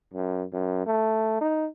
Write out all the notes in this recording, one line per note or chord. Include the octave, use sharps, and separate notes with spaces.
F#2
F#2
A3
D#4